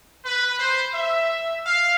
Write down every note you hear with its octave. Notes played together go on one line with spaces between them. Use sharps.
B4
C5
E5
F5